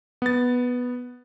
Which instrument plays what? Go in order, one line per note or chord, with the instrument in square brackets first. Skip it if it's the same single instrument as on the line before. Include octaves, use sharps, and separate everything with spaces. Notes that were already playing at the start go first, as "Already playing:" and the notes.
[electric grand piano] B3 A6